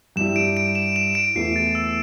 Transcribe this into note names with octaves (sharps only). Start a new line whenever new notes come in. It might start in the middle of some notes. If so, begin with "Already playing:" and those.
G2 G3 E4 E7
D7
D7
E7
E7
D7
E2 E3 A3 E4 C7
A6
E6